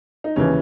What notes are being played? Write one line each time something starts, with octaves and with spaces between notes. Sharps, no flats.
D#4
D#2 C#3 E3 C#4